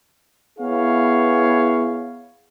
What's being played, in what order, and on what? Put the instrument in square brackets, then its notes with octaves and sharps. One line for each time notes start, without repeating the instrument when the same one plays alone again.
[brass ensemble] B3 E4 G#4 C#5 F5